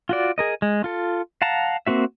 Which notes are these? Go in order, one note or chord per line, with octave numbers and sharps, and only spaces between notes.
F4 F#4 D5
G#4 A#4 D#5
G#3
F4 A4
F5 F#5 A5 A#5
A#3 C4 F#4 E5